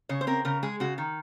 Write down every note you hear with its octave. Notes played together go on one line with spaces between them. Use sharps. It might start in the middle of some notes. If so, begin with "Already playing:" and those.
C#3 C#5
C5
C4 A#4
C#3 A#4
G#3 G#4
C#3 F#4
D#3